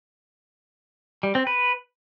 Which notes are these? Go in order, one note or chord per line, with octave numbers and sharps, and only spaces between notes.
G3
C4
B4